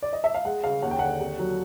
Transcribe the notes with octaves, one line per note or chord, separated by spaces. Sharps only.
D5
D#5
E5
F5
G#3 F#5
C#3 F5
D#2 F#5
G5
D3 F#5
C3
F#3